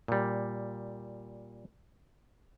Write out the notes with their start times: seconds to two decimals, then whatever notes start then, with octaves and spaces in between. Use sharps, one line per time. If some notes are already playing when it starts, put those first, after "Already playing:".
0.08 A#2 G3